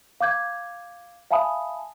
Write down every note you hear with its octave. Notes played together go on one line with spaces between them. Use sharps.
F5 D6 G6 G#6
E5 F5 G#5 A5 B5 D#6